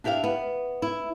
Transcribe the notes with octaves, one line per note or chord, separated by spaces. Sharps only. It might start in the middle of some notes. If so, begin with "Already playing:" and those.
D4 E4 G4 E5 F5
B3
E4